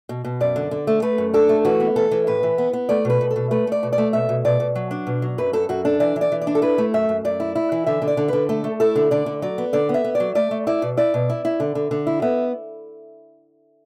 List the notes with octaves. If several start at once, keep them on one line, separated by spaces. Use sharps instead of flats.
B2
B2
F#2 D5
D3
D3
A3
A3 B4
F#2
D4 A4
A3
E3 F#4
B3
E3 A4
E3
A2 B4
E3
B3
B3
A3 D5
B2 B4
B2
A4
B2
A3 B4
A3 D5
B2
D5
A3
B2 E5
B2
B2 D5
B2
F#3
D4
B2
F#3
F#2 B4
F#2 A4
F#2 F#4
D4 A4
E3 D5
E3
D5
E3
D5
D4
A4
E4 B4
A3
F#2 E5
F#2
F#2 D5
E4
E4
E3
D3 E5
D3
D5
D3
D3 B4
A3 A4
A3
E4 A4
D3
D3 D5
D3
F#3 D5
B3
D3 D5
B3
E5
B3
D5
F#3
A3 D5
A3
E4 D5
B2
E4 D5
B2
E4
E4
D3
D3
D3
E4
B3 E5